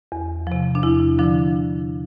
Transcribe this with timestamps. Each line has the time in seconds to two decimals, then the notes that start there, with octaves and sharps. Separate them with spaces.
0.12 E2
0.47 C3 F3
0.75 D4
0.83 E2 E4
1.18 D3 F3 D4